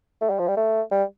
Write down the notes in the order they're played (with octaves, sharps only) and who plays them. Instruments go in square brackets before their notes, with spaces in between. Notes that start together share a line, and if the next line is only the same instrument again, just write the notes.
[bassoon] A3
G3
F3
G3
A3
G3